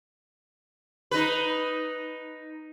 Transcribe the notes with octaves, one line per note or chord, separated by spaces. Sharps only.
D#4 B4